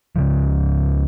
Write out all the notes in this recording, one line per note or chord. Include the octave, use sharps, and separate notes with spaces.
C#2 C#3 F3